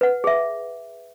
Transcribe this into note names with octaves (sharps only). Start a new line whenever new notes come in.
B4 F#5
G#4 E5